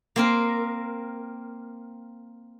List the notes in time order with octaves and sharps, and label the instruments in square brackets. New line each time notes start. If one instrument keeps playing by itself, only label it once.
[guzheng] A#3 C4 A#4